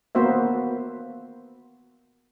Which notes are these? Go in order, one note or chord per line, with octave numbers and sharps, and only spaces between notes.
A#3 B3 F#4 C5 E5